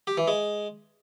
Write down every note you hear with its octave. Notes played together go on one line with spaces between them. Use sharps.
G4
E3
G#3